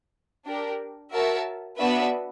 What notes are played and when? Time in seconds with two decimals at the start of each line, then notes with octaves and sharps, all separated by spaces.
0.47 D4 G4 A#4
1.13 F#4 A#4 C#5 E5 A5
1.80 B3 D4 F#4 B4 E5